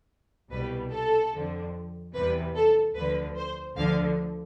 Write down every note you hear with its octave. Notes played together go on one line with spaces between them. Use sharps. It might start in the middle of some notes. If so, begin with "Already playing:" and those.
C2 B2 G3 B4
A4
F2 D3 F3
E2 C3 E3 G3 B4
A4
D2 D3 F3 B4
C5
D2 D3 F3 F5